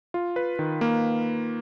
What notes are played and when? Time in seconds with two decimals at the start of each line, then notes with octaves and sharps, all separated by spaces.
0.14 F4
0.36 B4
0.59 D#3
0.81 A#3